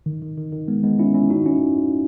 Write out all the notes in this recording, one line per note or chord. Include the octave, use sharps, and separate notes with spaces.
D#3
D#3
D#3
D#3
G#3 B3
G#3 B3
C#4 E4
C#4 E4
D#4 F#4
C#4 E4